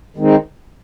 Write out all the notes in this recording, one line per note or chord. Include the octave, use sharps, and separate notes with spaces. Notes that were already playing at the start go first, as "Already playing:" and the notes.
D#3 G#3 C4 D#4